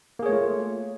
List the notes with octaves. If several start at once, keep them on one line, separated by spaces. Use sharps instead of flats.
A3 A#3 F4 G#4 C#5